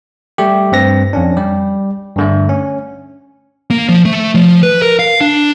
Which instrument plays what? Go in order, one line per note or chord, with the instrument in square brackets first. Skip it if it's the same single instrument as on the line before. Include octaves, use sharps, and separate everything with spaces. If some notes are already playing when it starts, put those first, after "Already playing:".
[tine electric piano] G3 A3 G4
G2 C4 A#6
F2 C#4 D4
G3 G4
G2 D3 A3
C#4
[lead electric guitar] A#3
F3
A3
F3
B4
A#4
F5
D4